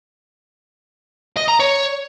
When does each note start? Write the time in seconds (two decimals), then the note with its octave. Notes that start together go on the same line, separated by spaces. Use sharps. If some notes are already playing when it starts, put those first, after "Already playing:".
1.36 D#5
1.48 A#5
1.60 C#5